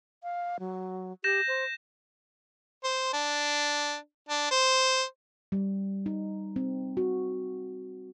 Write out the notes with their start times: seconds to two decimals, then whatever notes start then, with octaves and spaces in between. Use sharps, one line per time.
0.23 F5
0.60 F#3
1.24 G4 G6 A#6 E7
1.48 C5
2.84 C5
3.13 D4
4.29 D4
4.51 C5
5.52 G3
6.06 D#4
6.56 C4
6.97 F#4